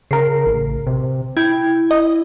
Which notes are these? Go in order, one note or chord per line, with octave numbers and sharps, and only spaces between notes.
C#3 A#4 C7
A1
C3
E4 G5 G#6
D#5